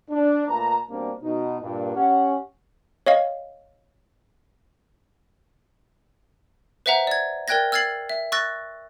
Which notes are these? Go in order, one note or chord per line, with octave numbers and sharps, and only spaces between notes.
D4
A#2 A3 B4 A5 A#5
B2 G3 A#3 C4 D4
B2 D#4
G2 A#2
C#4 G4 F#5
C#5 D#5 F5
B4 C5 E5 F#5 A#5
D5 G#6
A#4 D5 G5 F#6 G#6 A#6
E6 F6 G#6 A6 C7 F#7
E5
C#6 E6 F#6 A6 A#6